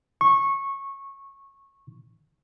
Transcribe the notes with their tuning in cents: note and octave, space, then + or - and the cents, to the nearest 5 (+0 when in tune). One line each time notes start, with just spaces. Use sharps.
C#6 -15